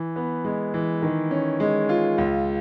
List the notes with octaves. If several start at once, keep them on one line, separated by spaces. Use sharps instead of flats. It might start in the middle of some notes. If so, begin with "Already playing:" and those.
Already playing: E3
B3
G#3
E3
D#3
C#4
G#3
F4
C#2